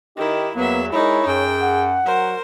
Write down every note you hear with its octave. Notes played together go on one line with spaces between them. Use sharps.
D#3 D#4 E4 G4
E2 F#3 A#3 B3 E5
G#3 D#4 E4 A#4 C#5
F#2 G#4 G5
F#5
F#3 A#4 C5